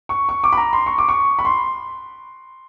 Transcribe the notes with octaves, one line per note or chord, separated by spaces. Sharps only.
C#6
C#6
D6
B5
A#5
C6
C#6
D6
C#6
B5
C6